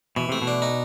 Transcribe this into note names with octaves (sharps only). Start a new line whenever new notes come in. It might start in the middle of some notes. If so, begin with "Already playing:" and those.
B2 E3
C3 A3
B2
D4
D#4